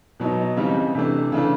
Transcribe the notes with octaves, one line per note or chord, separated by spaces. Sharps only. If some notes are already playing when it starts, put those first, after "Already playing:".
B2 F#3 B3 D#4
C#3 E3 G3 C4 D#4
C3 E3 A3 D4
C#3 E3 A3 D4